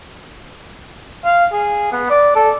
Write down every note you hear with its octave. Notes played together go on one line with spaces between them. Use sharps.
F5
G#4
B3
D5
A4